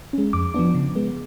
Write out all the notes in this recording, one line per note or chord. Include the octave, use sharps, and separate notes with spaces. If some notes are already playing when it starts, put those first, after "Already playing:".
G#3 C#4
F2 D6
F3 B3 D4
C#3
G#3 B3